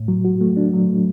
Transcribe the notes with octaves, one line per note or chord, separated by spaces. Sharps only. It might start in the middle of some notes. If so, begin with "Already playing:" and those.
Already playing: A2
F#3
F#4
A3
D4
F#3
A3